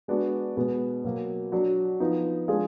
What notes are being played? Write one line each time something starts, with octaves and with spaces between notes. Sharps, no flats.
G#3 B3 D4 F#4
B2 G#3 B3
B2 F#3 A#3
F#3 D4 F#4
F3 B3 D#4
F3 G#3 D4 F4 G#4